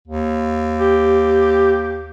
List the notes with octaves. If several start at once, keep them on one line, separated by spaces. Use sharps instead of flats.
D#2
G4